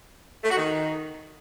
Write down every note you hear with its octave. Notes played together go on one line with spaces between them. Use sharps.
A3
F#4
D#3